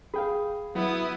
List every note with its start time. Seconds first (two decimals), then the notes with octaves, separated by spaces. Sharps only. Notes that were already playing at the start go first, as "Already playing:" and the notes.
0.14 G#4 F5 G5 B5
0.75 F#3 B3 E4 D#6